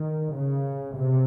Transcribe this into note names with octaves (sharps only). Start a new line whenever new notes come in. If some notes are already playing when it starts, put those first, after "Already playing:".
Already playing: D#3
C#3
C3